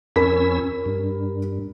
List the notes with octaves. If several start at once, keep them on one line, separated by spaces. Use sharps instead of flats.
F2 C#4 A#4 B5 E6 B6
G2